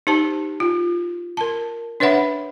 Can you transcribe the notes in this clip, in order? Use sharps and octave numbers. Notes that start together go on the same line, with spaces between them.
D#4 G4 C5 A5
F4
A#4 A5
D4 B4 C#5 E5 F#5 B5